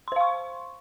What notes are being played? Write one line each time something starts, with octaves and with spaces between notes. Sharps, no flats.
C5 F5 C6 C#6